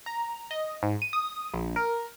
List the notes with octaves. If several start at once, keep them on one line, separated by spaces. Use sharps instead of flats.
A#5
D#5
G#2
D#7
D#6
A#1
A#4